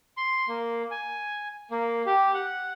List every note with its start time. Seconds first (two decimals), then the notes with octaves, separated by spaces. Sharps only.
0.17 C6
0.48 A#3
0.91 G#5
1.71 A#3
2.06 G4
2.34 F#5